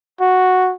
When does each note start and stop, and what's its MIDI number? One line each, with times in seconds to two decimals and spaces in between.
0.21 0.72 66